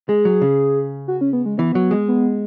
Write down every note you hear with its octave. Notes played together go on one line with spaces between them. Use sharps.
G#3 G#4
F#3
C#3
F#4
C#4
B3
G#3
E3 B3
F#3
G#3
B3